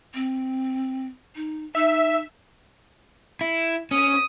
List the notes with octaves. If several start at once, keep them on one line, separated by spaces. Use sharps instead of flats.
C4
D#4
D#4 E5
E4
C#4 D#6